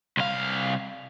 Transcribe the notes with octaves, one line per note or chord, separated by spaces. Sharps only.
C2 F5